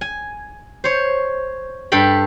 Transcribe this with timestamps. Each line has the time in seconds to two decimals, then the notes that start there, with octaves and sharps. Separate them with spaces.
0.01 G#5
0.84 C5 C#5
1.92 G2 A4 G5 B5